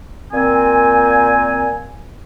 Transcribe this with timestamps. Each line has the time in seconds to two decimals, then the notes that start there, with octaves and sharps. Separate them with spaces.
0.32 A#2 C4 G#5